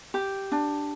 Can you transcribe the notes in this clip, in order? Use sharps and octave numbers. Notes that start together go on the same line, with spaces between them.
G4
D4